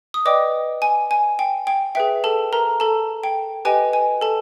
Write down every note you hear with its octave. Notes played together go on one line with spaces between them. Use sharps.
D#6
B4 D5 D#5 G5 D6
G#5
G#5
G5
G5
G#4 B4 E5 G5
A4 A5
A#4 A#5
A4 A5
G5
G4 B4 D#5 G5 G#5
G#5
A4 A5